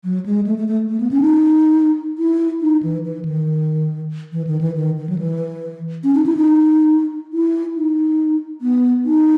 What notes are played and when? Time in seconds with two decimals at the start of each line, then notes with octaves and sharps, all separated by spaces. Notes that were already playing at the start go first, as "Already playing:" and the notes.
0.04 F#3
0.26 G#3
0.46 A3
0.58 A3
0.68 A3
0.89 A3
1.00 B3
1.11 C#4
1.21 D#4
2.18 E4
2.61 D#4
2.83 E3
3.04 E3
3.25 D#3
4.32 E3
4.47 D#3
4.61 E3
4.75 D#3
4.97 D#3
5.09 F#3
5.18 E3
6.04 C#4
6.15 D#4
6.26 E4
6.37 D#4
7.33 E4
7.76 D#4
8.61 B3
9.05 D#4